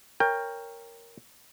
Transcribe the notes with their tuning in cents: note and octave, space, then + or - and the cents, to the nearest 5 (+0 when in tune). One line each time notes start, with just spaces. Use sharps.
A#4 +0 C#5 +0 G5 +20